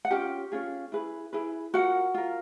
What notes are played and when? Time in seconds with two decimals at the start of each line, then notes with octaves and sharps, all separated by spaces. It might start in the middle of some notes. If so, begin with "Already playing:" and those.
0.05 F#5
0.11 C#4 F4 G4 G5
0.52 C#4 F4 G#4
0.92 E4 G#4 B4
1.33 E4 G#4 B4
1.74 F4 F#4 A#4 F#5
2.14 F4 A#4